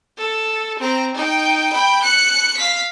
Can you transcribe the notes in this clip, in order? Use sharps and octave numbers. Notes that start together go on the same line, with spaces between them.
A4
C4 A#5
D#4 G5
G5 B5
F#6 C#7
F5 B6